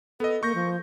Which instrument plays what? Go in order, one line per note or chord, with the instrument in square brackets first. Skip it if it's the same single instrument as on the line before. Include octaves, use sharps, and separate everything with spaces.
[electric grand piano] B3 D#5 [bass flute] A4
[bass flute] A#3 [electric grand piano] C#6 G6 A#6
[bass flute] F3